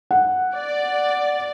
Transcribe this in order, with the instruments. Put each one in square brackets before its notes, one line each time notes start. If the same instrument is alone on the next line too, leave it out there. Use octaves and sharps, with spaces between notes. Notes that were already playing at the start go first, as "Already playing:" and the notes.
[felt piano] F#5
[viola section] D5